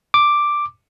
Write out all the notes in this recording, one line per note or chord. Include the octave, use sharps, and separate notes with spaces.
D6